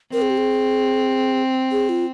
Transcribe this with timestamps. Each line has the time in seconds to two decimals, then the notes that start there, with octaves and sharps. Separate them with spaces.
0.13 C4 A#4
0.22 G#4
0.30 G4
0.38 G#4
1.72 G#4
1.89 F4